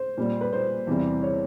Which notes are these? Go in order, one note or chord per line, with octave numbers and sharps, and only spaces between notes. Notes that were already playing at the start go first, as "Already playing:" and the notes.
Already playing: C5
A#2 G3
B4
C5
E2 C3 E3 G3
C#5